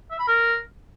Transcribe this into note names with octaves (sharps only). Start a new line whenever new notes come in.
E5
B5
A#4